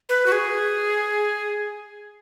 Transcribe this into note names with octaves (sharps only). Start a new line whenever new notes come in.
B4
F#4
G#4